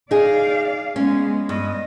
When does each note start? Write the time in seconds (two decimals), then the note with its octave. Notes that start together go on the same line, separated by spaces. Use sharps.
0.11 D#4 G#4 D5 F5
0.96 G#3 B3 C#4
1.49 G2 D#5